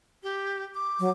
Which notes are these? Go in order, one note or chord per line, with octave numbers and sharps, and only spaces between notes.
G4
D6
F#3